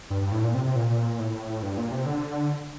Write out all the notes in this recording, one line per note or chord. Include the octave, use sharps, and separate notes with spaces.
G2
G2
A2
A#2
C3
C3
A#2
A2
G2
A#2
C3
D3